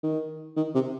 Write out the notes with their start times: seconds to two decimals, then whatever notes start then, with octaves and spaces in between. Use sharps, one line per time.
0.03 D#3
0.57 D#3
0.75 C3